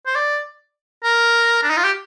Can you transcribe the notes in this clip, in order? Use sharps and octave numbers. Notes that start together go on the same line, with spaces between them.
C5
D5
A#4
D4
D#4
F4
G4